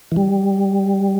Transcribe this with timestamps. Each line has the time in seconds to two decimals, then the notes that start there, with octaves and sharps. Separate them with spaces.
0.12 E3
0.16 G3